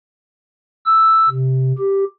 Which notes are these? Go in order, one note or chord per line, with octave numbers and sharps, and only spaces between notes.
E6
C3
G4